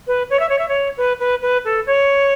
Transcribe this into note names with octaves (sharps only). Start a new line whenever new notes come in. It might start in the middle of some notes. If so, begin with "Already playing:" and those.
B4
C#5
E5
C#5
E5
C#5
B4
B4
B4
A4
C#5